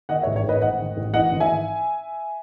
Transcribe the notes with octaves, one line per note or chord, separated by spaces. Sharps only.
D#3 D#5 F#5
A1 C#5 E5
C#5
A1
B4 D#5
G#2 D#5 F#5
D#3
A1
E3 D#5 F#5
G#1
E5 G#5